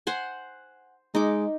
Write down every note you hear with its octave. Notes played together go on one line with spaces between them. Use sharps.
C5 F#5 G#5
G#3 D#4 D6